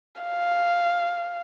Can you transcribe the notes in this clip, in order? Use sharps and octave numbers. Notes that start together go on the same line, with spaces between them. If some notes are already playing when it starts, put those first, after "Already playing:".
F5